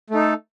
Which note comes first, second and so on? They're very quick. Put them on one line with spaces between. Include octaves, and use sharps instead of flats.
A3 D#4 A4